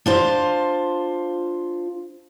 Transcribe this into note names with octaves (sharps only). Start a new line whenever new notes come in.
D4 F4 C5